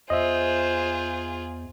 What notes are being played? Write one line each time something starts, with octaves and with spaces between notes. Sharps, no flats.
E2 F4 G#4 C5 D#5 E5